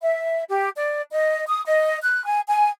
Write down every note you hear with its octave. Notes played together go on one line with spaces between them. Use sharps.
E5
G4
D5
D#5
D#6
D#5
F#6
G#5
G#5